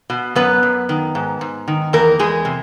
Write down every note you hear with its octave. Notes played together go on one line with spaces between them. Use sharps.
B2
F#2 B3 B4
F#2
D#3
G#2
G#2
D#3
E2 A#3 A#4
E2 G#3 G#4
C3